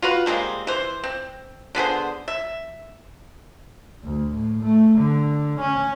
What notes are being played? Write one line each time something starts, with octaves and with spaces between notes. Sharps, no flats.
F4 F#4 B4
G3 G#3 A#3 C4
E3 C5
C4
D3 B3 G#4 C5
E5
D2
A2
A3
D3
C#4